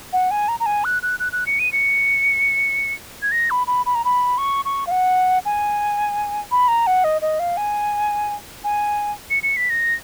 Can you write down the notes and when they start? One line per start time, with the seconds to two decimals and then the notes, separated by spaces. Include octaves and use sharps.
0.13 F#5
0.31 G#5
0.48 A#5
0.60 A#5
0.66 G#5
0.85 F#6
1.03 F#6
1.20 F#6
1.32 F#6
1.47 C#7
1.59 D#7
1.72 C#7
3.22 G#6
3.32 A#6
3.51 B5
3.67 B5
3.86 B5
3.95 A#5
4.05 B5
4.38 C#6
4.65 C#6
4.87 F5
4.91 F#5
5.45 G#5
6.51 B5
6.68 A#5
6.87 F#5
7.04 D#5
7.22 D#5
7.40 F5
7.57 G#5
8.64 G#5
9.30 C#7
9.43 C#7
9.57 B6
9.70 A#6